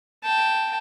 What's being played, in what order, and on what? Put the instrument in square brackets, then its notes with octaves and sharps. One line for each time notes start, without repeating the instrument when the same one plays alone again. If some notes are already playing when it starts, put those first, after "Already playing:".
[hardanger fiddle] G5 A5